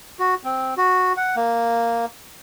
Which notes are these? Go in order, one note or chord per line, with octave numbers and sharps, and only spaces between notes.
F#4
C4
F#4
F#5
A#3